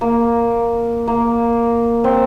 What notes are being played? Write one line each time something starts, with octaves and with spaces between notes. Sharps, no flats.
A#3
A#3
C4